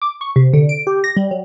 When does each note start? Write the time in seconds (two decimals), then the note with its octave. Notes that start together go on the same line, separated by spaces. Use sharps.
0.02 D6
0.21 C#6
0.36 C3
0.53 D3
0.69 D7
0.87 G4
1.04 A#6
1.17 G3
1.31 F#3